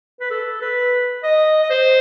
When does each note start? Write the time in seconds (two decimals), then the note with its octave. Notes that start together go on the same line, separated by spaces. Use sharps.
0.20 B4
0.30 A4
0.62 B4
1.23 D#5
1.63 D#5
1.70 C5